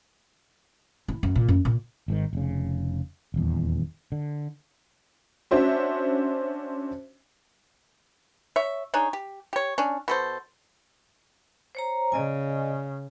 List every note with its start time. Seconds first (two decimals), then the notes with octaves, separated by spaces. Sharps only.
1.08 E4
1.23 F#2
1.35 A#2
1.48 F#2
1.65 A#2
2.08 G#1 G#2 D#3
2.33 F1 C#3
3.34 D#1 E2
4.12 D3
5.51 C#4 D4 F#4 C5 E5
8.56 C#5 E5
8.94 D4 D#4 G#4 C#5
9.13 G4
9.53 G4 C#5
9.78 C#4 D4
10.08 B2 A4 C5
11.75 C5 C#5 A#5
12.12 C#3 D5 D#5 G#5